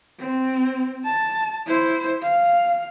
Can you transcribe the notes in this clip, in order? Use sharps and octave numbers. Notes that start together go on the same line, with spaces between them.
C4
A5
E4 C5
F5